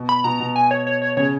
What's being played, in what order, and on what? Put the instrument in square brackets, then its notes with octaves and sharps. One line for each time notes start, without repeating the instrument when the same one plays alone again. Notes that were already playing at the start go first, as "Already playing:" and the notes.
Already playing: [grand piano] B2
[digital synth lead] B5
[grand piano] B2 [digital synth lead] A#5
[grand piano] B2
[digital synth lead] G#5
C#5
C#5
C#5
[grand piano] C#3 [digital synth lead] C#5